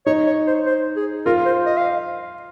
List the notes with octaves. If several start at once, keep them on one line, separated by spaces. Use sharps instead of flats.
D#4 C#5
C#5
C5
C5
G#4
F4 A#4
C5
D#5
F5